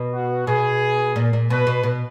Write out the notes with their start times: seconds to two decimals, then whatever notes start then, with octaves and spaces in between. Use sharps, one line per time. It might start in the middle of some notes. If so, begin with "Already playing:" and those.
Already playing: B2
0.13 F#4
0.47 B2 G#4
1.16 A#2
1.33 A#2
1.50 B2 B4
1.67 B2
1.83 B2